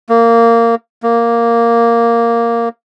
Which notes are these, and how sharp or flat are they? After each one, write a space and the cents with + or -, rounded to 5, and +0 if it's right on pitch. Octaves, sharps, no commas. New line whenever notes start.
A#3 -15
A#3 -5